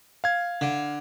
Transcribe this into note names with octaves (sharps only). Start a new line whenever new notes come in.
F5 G#6
D3